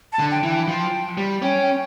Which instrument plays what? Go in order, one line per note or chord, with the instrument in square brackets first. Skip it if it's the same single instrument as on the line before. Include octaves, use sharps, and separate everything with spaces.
[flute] A5
[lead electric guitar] D3
[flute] G5
[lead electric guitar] E3
[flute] G5
[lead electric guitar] F3
G3
[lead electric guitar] C#4 [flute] G5
[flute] G5